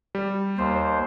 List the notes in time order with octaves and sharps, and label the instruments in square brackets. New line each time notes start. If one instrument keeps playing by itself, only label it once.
[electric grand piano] G3
[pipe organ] D#2 C5